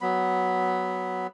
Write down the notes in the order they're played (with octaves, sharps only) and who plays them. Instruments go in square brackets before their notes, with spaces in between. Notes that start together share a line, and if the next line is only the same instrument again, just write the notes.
[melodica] F#3 B3 B5